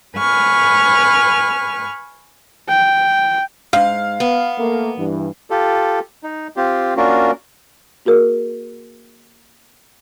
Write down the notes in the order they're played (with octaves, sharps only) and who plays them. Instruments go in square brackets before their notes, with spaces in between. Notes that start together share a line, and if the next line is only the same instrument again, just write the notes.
[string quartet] B4 G#5 C#6 F6
[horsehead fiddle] G5
[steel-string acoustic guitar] G#2 [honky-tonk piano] F5
[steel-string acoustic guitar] B3
[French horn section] A3 A#3
G2 E3
[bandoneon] F4 G4 A4
D#4
C4 F4 G4
A#3 C#4 D4 F4 F#4 A#4
[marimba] A#3 F#4 G#4 A#4